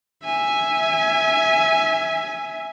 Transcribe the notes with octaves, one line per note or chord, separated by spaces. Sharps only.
E5 G#5